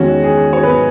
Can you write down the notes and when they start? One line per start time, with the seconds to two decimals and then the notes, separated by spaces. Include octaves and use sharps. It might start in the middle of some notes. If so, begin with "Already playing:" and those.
Already playing: E2 D#3 G#3 C#4 F#4
0.23 G#4
0.53 C#5
0.63 G#2 F#3 B3 B4